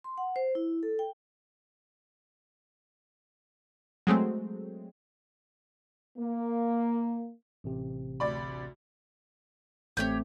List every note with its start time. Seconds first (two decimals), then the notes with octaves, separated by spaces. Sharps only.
0.04 C6
0.18 F#5
0.36 C5
0.55 E4
0.83 A4
0.99 G5
4.07 F#3 G#3 A3 C4
6.18 A#3
7.64 A1 C3
8.20 D2 D5 B5
9.97 A1 A3 C4 G4 C#5 G6